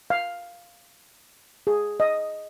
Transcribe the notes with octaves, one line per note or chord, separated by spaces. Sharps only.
F5
G#4
D#5